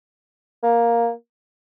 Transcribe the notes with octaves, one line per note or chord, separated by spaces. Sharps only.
A#3